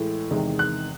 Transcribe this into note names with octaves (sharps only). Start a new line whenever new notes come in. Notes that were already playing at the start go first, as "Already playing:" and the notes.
Already playing: A2 E3 G#3
E2 C3 D#3 G#3
F#6